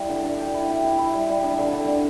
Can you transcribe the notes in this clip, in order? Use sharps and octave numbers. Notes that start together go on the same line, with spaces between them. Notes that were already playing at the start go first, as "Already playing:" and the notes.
Already playing: G3 E4
D3
D4
G4
E4
G4
E4
E4
G3
G3
D4
D3
D3
D3